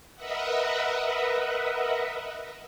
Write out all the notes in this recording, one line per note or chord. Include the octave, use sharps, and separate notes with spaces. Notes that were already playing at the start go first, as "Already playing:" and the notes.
A#4 B4 D#5 E5 F#5